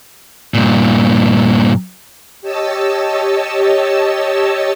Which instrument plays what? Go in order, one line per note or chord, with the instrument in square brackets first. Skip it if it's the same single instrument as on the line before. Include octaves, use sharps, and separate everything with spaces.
[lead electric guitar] G2 A#2
[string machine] G4 C#5 D#5 A5 E6